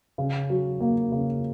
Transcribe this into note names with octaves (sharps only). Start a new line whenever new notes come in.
C#3
F#3
A#3
C#3